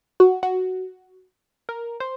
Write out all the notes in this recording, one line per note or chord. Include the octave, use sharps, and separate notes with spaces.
F#4
F#4
A#4
C5